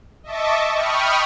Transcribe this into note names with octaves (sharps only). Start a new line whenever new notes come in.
D#5 E5 A5 C#6 D6
G5 B5 C#6 D#6 F6